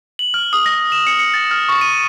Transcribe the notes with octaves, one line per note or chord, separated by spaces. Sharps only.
F#7
F6
D#6
A#6
E7
C#7
C#7
A6
F6
C#6
D#7